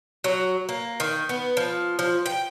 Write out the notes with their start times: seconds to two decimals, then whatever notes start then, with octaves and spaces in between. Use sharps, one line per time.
0.24 F#3
0.69 A#3
1.00 D#3
1.29 B3
1.57 F3
1.99 F3
2.26 G5